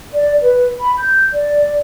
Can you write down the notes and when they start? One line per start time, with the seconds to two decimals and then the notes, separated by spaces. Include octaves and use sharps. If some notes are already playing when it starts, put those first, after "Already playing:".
0.13 D5
0.41 B4
0.80 B5
0.98 G6
1.33 D5